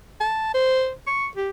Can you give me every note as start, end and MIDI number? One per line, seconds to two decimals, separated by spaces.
0.20 0.53 81
0.54 0.91 72
1.07 1.27 85
1.37 1.50 67